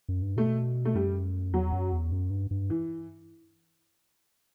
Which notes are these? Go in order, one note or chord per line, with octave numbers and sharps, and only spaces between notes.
F#2
G2
B2 A3
A3
F#2 G3
E2 F#3
F#2
E2
F#2
G2
G2
E3